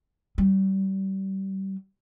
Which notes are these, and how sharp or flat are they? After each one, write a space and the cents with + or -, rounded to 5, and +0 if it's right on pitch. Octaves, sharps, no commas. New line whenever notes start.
G3 -30